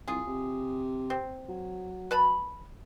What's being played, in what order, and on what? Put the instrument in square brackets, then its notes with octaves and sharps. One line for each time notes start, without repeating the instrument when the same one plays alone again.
[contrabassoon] C2 [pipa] F4 G#4
[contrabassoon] C3
[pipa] C4
[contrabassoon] F#3
[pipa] B4 A5 B5